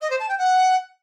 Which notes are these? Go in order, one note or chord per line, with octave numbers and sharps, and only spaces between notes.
D#5
C5
A5
G5
F#5